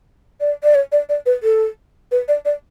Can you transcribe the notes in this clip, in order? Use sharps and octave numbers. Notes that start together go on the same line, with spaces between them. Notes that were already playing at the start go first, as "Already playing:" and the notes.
D5
D5
C#5
D5
D5
B4
A4
B4
D5
D5